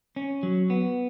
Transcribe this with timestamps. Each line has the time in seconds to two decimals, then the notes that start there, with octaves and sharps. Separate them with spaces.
0.16 C#4
0.43 F#3
0.70 B3